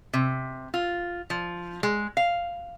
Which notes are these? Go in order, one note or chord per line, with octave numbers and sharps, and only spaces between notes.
C3
F4
F3
G#3
F5